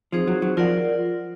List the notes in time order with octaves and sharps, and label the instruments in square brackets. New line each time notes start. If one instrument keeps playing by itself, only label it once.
[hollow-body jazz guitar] F3 [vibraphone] C4 D#4 G#4 C5
[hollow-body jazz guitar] F#3
F#3
[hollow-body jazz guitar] F3 [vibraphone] F4 A#4 D5 F#5